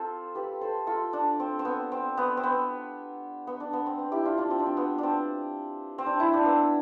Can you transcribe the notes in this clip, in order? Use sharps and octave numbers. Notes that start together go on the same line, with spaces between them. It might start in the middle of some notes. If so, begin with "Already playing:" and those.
Already playing: C4 F4 A4 C5
G4 B4
A4 C5
F4 A4
D4
C4
C4
B3
C4
B3
C4
B3
B3
D4
B3
C4
C4
E4 G4
D4 F4
D4 F4
C4
D4
C4
B3
C4 D4
C4
D4
E4
D4
B3